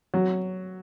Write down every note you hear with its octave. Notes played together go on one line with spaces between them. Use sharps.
F#3